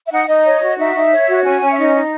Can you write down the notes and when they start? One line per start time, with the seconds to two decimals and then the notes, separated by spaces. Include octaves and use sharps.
0.06 E5
0.11 D#4 F#5
0.28 D#4 D#5
0.45 C#5
0.62 F#4
0.78 D#4 E5
0.95 D#4
1.12 C#5
1.28 F#4
1.44 C#4 G#5
1.61 C#4
1.72 E5
1.78 D#4 D#5
1.95 D#4